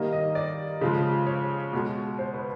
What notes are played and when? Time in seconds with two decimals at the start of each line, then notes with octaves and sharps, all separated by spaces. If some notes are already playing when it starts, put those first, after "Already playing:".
Already playing: D#3 G3 A#3 D#5
0.12 D#5
0.35 D5
0.81 C#3 F3 G#3
1.27 C#5
1.73 B2 G#3
2.18 C5
2.34 B4